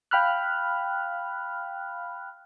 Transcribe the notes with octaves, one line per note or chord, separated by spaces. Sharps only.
F5 G5 B5 F6 F#6